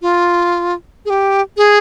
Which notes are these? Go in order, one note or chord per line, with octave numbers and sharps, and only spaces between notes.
F4
G#4
G4
G#4